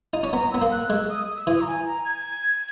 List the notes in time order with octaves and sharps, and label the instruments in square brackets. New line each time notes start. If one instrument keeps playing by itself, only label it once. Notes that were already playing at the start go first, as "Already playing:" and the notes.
[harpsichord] D#4
C#4
[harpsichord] B3 [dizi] A#5
[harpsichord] B3 [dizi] E6
[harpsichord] A#3
[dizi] F#6
[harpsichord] G#3 [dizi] E6
[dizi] D#6
E6
[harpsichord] E3 [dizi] D#6
[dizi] A#5
G#5
A#5
G#6